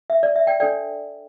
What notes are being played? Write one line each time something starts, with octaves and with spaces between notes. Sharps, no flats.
E5
D5
E5
D5 G5
D4 A4 C5 D5 G5